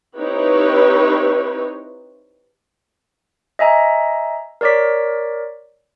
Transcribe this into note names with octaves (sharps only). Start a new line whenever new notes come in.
C4 D#4 E4 G4 B4 C#5
D#5 E5 G#5 A#5
A#4 C#5 D5 D6 B6